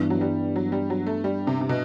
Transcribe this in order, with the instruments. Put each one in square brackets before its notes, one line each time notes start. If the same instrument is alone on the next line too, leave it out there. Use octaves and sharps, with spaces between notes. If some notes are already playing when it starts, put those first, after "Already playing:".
Already playing: [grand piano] G2 E3 B3 D4
[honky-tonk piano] F#3
G3
F#3
G3
F#3
A3
G3
C3
C3
B2